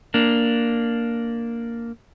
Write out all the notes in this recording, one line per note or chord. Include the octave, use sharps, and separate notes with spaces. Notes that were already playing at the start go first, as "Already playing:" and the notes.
A#3 D4